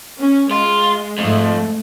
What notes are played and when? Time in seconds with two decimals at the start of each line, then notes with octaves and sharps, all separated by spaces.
0.20 C#4
0.51 G#3 F4
1.18 F2 G#2 A3